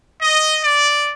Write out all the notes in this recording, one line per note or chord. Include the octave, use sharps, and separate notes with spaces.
D#5
D5